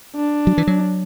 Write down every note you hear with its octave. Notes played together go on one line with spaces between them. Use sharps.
D4
F#3
E3
F#3